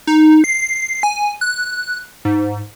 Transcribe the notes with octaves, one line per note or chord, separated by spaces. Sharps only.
D#4
C7
G#5
F#6
G#2